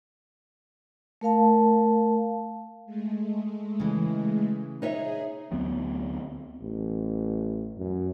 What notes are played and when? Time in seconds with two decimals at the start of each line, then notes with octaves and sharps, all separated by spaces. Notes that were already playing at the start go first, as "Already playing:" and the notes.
1.21 A3 A#4 F5 A5
2.86 G#3 A3
3.80 C#3 E3
4.82 D#4 G#4 C#5 E5
5.52 D2 F#3 B3 C4
6.61 A1
7.78 F#2